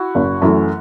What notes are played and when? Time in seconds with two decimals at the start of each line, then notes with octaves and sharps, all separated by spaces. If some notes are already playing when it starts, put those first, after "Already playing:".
Already playing: E4 F#4
0.15 F#1
0.42 F#2 E3 A3